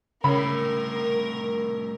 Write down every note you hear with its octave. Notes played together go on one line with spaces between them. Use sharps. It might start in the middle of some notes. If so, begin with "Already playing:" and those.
C2 A2 C#3 A#4 B5